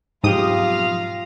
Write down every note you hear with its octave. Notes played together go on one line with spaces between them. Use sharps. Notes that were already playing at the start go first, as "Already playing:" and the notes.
B1 F2 G#2 F4 G4 F5 A#5 D#6